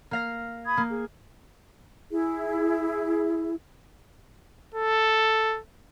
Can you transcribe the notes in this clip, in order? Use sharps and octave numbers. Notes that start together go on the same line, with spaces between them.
A#3 F5 A#6
B5 D#6 G#6
A#3
G#4
E4 G#4
A4